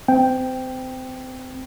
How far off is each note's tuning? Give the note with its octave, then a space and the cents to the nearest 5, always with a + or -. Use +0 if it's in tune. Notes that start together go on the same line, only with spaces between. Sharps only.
C4 -30 G5 +0